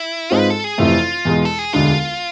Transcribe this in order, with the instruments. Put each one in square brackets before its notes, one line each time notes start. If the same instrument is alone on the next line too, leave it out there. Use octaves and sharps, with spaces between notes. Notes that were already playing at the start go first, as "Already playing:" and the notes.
Already playing: [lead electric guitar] E4
[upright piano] G#2 G#3 C4 F4
[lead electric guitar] B4
A4
G#4
[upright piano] F1 F2 C3 E3 A3 [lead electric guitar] F4
[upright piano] E2 B2 G#3
[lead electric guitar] A4
G#4
[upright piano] E1 D2 D3 G#3 D4 [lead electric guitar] F4